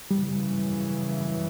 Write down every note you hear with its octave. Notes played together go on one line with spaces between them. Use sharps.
F#2 C#3 E3 G3